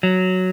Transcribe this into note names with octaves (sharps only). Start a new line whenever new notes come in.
F#3